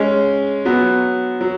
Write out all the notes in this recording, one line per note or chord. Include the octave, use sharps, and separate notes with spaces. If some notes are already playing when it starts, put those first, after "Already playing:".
Already playing: G#3 C#4
F#3 B3
F#3